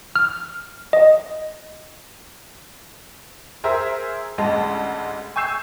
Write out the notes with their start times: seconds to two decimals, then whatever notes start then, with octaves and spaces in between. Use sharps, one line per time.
0.16 F6
0.93 D#5
3.64 G#4 A#4 C5 E5
4.38 A1 D2 G#3 A5
5.36 G#5 C#6 E6 G6 C7 E7